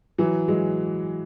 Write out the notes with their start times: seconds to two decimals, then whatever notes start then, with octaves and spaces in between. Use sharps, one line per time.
0.18 E3 F#3
0.48 F#3 G#3